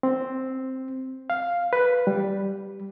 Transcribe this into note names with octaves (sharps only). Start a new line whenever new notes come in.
C4
F5
B4
G3